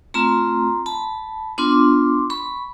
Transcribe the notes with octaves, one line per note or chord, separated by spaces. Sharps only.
A3 C4 F4 A#5 C6
A5 B5
B3 D4 F4 C6 D6
B5 C#6